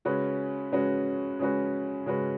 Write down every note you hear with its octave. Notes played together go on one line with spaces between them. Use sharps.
C#3 G#3 C#4 F#4 B4
C#3 G#3 C#4 F#4 B4
C#3 G#3 C#4 F#4 B4
C#3 G#3 C#4 F#4 B4